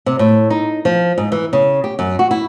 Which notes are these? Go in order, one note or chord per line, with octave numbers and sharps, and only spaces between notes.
C3
A2
D#4
F3
G#2
E3
C#3
G4
F#2
F#4
E4